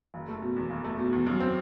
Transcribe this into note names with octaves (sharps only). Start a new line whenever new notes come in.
F#1
A3
B2
E2
F#1
A3
B2
E2
F#2
C4